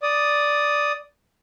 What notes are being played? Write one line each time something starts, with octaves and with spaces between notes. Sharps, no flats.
D5 D#6